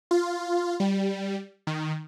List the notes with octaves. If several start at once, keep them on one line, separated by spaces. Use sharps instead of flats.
F4
G3
D#3